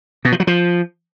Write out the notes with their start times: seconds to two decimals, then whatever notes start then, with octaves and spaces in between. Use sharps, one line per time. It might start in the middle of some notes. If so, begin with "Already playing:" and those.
0.25 B2
0.32 F3
0.40 F#3
0.47 F3